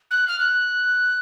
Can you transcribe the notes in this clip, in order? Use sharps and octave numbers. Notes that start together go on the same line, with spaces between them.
F#6
F6
F#6